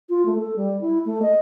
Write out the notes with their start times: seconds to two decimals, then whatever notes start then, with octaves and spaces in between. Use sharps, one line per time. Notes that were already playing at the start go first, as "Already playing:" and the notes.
0.09 F4
0.25 A3
0.39 A4
0.56 G3
0.81 E4
1.05 A3
1.22 D#5